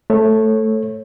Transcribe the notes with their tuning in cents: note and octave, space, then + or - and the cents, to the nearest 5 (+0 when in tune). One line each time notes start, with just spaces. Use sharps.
A3 +0 C#5 -25